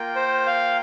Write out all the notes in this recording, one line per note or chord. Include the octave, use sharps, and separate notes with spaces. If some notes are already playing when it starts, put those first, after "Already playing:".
Already playing: A#3 F4 A#4 G5
C5
F5